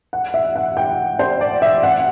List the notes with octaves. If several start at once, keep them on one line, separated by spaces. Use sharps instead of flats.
F#5
E5
F#5
G5
C5
D5
E5
F#5